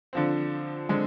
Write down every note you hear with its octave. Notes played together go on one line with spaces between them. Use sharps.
D3 F3 C4
D3 G#3 C4